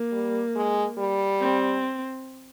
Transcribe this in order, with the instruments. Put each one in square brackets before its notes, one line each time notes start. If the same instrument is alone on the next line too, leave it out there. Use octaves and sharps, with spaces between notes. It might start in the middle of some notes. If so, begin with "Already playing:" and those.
Already playing: [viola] A#3
[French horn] G3
G#3
G3
[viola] C4